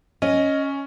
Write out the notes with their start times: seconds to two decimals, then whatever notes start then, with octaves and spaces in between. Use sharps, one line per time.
0.22 C#4 D#5